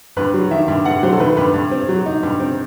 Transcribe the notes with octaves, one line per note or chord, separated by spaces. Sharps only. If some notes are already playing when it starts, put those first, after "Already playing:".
G2 B4
F#3
D#3 E5
G2
G2 F#5
F#3 C5
A4
D#3 B4
G2 B4
G2
C4
F#3
D#4
G2
C4